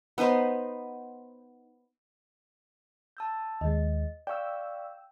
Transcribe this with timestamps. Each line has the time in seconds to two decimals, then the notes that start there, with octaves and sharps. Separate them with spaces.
0.18 B3 D#4 B4 C5
3.17 A5 E6 G6
3.61 D#2 G#3 D#5
4.27 D5 F5 G5 C#6 E6